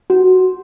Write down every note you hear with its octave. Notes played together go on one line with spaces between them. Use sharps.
F#4